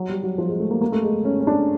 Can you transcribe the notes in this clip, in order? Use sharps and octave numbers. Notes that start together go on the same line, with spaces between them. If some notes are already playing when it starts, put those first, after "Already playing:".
Already playing: F#3
G3
F#3
F3
G#3
A3
A#3
A#3
A3
G#3
C#4
C#4
D4